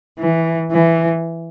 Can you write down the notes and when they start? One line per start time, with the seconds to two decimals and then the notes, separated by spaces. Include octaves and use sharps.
0.19 E3
0.71 E3